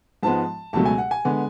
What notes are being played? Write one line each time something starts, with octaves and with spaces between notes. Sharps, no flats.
G#2 F3 G#3 B3 A5
C#2 B2 F#3 A3 A5
G#5
F#5
G#5
D3 G#3 B3